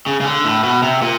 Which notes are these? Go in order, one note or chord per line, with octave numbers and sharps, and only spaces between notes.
C#3
C#3
D3
A2
B2
C3
A#2